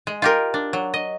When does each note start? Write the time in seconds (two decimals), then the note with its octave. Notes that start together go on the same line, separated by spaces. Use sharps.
0.07 G#3
0.22 F4 G4 A#4
0.54 D4
0.73 F#3
0.94 D#5